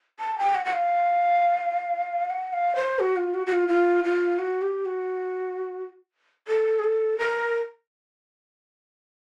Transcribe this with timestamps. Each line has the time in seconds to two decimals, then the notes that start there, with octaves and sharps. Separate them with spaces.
0.20 A5
0.38 G5
0.55 F#5
0.65 F#5
0.73 F5
2.30 F#5
2.53 F5
2.76 C5
2.99 F#4
3.16 F4
3.34 F#4
3.47 F#4
3.52 F4
3.69 F4
4.04 F4
4.39 F#4
4.62 G4
4.85 F#4
6.48 A4
6.79 G#4
6.84 A4
7.18 A#4